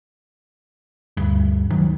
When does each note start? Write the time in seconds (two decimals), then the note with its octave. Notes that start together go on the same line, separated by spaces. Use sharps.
1.17 D2 G2
1.70 D#3 F#3